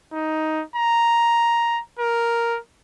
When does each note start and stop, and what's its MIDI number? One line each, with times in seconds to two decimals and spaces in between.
0.13 0.62 63
0.76 1.80 82
1.99 2.58 70